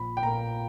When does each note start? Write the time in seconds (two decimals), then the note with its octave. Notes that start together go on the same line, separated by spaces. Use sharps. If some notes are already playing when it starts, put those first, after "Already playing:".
Already playing: A#1 B5
0.17 G5
0.23 A#2 A#3 A#5